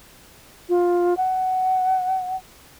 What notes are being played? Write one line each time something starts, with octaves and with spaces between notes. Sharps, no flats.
F4
F#5